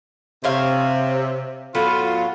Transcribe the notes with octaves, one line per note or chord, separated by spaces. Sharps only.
C3 C5 C#5 F5
A2 F#3 B3 F4